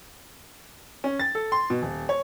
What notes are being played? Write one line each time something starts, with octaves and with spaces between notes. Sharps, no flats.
C#4
A6
A4
C6
B2
D#1
C#5